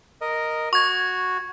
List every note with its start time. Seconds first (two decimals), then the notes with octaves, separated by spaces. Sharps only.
0.21 A#4 D#5
0.73 F#4 C#6 G#6